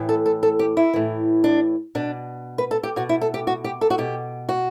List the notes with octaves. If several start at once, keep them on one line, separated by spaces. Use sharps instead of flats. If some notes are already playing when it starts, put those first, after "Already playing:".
Already playing: A2 E3
A4
A4
A4
G4
E4
A2 E3
D4
B2 D4
B4
A4
G4
B2 F#4
E4
A4
G4
F#4
G4
A4
F#4
B2 G4
F#4